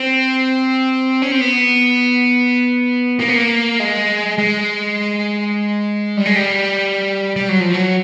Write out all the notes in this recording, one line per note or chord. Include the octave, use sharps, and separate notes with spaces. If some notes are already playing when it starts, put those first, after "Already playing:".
Already playing: C4
C#4
C4
B3
A#3
B3
A#3
G#3
G#3
G3
G#3
G3
G3
F#3
F3
F#3